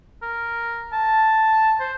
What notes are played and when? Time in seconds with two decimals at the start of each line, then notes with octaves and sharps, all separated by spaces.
0.23 A#4
0.93 A5
1.80 C5